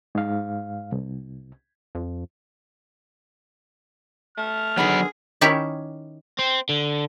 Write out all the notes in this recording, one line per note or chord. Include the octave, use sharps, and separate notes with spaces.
G#2 F5
C2
F2
A3 F6
D3 D#3 F#3 B3 G#4 B5
D#3 C#4 E4 G4 C#5 E5
C4
D3